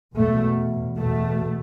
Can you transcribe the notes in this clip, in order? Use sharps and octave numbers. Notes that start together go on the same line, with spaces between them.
E2 B2 A3
E2 B2 A3